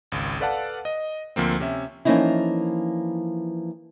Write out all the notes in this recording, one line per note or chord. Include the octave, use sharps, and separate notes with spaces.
G#1 C#2
A4 B4 D5 F5 F#5 A5
D#5
D2 F3 A#3 C4
C3 C#4 E5
E3 F3 A#3 C#4 D#4 E4